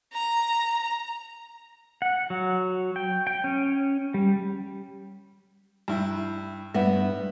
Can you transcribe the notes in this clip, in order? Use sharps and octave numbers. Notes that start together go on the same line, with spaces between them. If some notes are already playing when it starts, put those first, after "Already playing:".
A#5
F#5
F#3
G5
G5
C#4
G3
G2 E4
G2 B3 E5